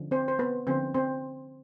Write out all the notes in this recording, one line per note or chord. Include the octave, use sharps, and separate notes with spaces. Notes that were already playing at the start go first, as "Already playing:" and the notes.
Already playing: D3 F3 G#3 C#4
C4 C5
C5
B3 B4
D3 F3 A#3 C4 C#4 C5
C4 C5